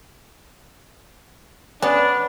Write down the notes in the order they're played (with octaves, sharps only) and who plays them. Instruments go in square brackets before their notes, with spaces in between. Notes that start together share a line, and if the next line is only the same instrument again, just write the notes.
[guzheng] B3 [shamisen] C#4 [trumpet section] D4